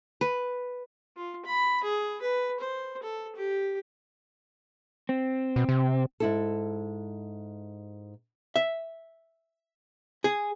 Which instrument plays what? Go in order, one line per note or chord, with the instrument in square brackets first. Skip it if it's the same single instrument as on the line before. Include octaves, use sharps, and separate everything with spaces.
[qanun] B4
[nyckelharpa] F4
B5
G#4
B4
C5
A4
G4
[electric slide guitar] C4
[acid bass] B2
C3
[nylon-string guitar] G#2 E4 A4
[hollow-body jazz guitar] E5
G#4